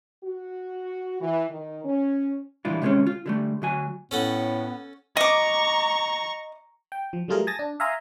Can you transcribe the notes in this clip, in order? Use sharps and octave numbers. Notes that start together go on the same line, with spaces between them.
F#4
E3
D#3
C#4
A#2 E3 G3 D4 E4 F4
C3 D#3 G#3 A#3 C4 C#4
F4
D3 G3 A3
D2 F#3 G#5
A2 B3 C#4 A4 F#5
D#5 A#5 C#6 D6
G5
F3
F#3 G3 A3 F4 G#4 A#4
G#5 A5 D#6 A6 A#6
D4
E5 F5 G#5 A#5 C6 D#6